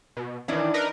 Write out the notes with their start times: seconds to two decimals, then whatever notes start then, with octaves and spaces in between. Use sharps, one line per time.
0.17 B2
0.48 D#3 E3 C#4 D4 E4
0.74 D#4 A#4 B4